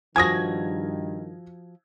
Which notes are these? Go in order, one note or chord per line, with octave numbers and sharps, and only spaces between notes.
G2 D#3 F3 F#4 G#5 D#6 G#6 A#6